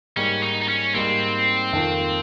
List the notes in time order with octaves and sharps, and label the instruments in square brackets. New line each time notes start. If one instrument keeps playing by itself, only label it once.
[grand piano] G#2 G3 A#3 [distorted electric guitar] C#4
[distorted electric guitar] D#4
D#4
C#4
[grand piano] G#2 G3 A#3 [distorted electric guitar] C4
[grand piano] F2 D#3 A#3 F4